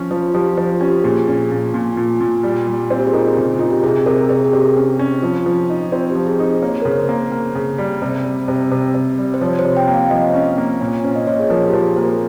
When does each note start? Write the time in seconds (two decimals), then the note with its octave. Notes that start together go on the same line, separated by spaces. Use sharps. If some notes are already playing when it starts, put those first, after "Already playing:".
Already playing: F3 C#4
0.11 F3 F4
0.34 F3 G4
0.57 F3 F4
0.80 C#4 G4
1.04 A#2 G#4
1.28 C#4
1.51 A#2
1.74 A#2
1.97 A#2
2.21 A#2
2.43 G3
2.67 G3
2.90 C4 F4
2.99 G4
3.07 G#4
3.13 D#4 A#4
3.37 C#3
3.59 D#4 F4
3.70 G4
3.83 C3 G#4
4.06 C3 A#4
4.29 C3 G#4
4.44 G#4
4.53 C3 G4
4.76 C#4
4.99 C#4
5.22 F3 F4
5.46 F3
5.69 D#4
5.92 C4 F4
6.10 G4
6.15 F3
6.27 G#4
6.39 D#4
6.62 A#3 C#5
6.72 C5
6.82 C#3 A#4
6.92 C5
7.09 A#3
7.32 A#3
7.55 C#3
7.78 G3
8.02 C3
8.25 G3
8.48 C3
8.71 C3
8.94 C3
9.18 G3
9.34 C5
9.41 F3 C#5
9.59 C5
9.65 C3
9.77 G5
9.87 A#3
9.94 F5
10.10 F3 D#5
10.34 C#4
10.58 A#3
10.80 A#2 C#5
11.04 C#4 C5
11.15 D#5
11.27 A#2 C#5
11.39 G#4
11.50 F3 A#4
11.68 G4
11.73 F3
11.85 G#4
11.96 A#3 C5
12.03 A#4